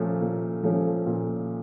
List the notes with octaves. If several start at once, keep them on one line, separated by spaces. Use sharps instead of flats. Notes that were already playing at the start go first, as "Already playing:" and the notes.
Already playing: A#2 F3 A3 C#4
A#2
F3 A3 C#4
A#2